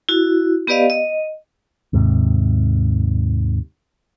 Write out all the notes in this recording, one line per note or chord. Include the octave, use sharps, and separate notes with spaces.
E4 F#4
B3 G4 B4 D5 D#5 F5
D#5
D#2 G#2 C3